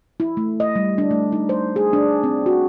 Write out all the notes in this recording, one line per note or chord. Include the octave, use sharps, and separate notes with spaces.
E4
A3
D#5
G3
D4
A3
D#4
C5
G#4
D4
C4
F#4